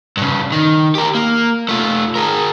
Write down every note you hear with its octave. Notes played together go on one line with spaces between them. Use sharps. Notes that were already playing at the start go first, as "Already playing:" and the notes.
G2 C#3
D#3
G4 A#4
A#3
A3 F4
G#4 A#4